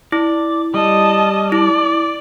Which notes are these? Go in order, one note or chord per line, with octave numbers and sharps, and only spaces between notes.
E4 D5
G3 D#5 A5
E4 D5